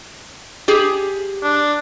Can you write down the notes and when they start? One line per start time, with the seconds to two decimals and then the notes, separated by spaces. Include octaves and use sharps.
0.68 G4 G#4
1.43 D4